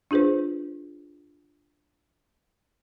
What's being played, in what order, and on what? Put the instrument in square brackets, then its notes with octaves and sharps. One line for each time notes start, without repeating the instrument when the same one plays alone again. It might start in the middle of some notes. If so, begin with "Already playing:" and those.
[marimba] D4 F4 G#4 B4 C5